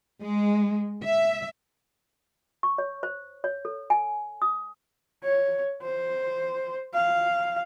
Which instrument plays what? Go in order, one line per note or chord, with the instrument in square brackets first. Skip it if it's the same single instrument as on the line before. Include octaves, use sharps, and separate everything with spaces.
[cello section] G#3
E5
[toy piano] C#6
C#5
C5
C#5
A4
G#5
D#6
[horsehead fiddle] C#5
C5
F5